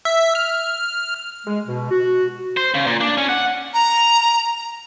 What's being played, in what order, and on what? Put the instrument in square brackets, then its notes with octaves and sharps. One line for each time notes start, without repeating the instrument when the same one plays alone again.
[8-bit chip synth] E5
F6
[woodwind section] G#3
B2
F#4
[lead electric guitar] C5
C#3
A#2
D4
C#4
F#5
[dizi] A#5